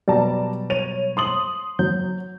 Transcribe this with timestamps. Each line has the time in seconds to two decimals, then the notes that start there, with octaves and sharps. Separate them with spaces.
0.08 B2 F#3 G3 D5 A5 A#5
0.70 C#5 D#7 F7
1.17 C6 D#6 F#7
1.79 F#3 G6